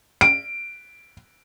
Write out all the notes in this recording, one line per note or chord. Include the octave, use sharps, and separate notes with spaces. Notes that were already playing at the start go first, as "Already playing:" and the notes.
D7